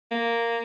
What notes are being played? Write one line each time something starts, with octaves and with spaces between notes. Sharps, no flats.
A#3